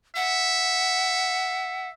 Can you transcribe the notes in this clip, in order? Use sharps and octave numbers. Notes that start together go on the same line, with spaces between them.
E5 F#5